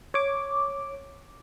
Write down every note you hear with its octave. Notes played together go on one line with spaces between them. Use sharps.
C#5 D6